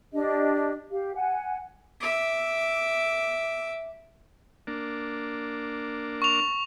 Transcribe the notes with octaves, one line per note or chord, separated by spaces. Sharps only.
D4 G4 D#5
G4 F5
F#5 G#5
E5 D6
A#3 D4
C#6 F7